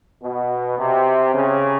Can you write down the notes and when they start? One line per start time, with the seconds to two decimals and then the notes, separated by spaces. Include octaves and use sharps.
0.23 B2
0.79 C3
1.35 C#3